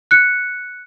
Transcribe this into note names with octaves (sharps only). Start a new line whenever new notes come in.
F#6 C#7